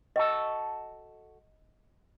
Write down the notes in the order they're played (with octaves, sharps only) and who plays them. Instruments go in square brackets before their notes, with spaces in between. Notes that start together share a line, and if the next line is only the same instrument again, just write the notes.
[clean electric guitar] F#4 A4 [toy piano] D#5